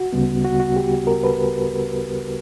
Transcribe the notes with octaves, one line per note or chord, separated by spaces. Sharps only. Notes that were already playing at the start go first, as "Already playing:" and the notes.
Already playing: F#4
D2 C#3 G3 B3
F#4
F#4
G4
A#4
B4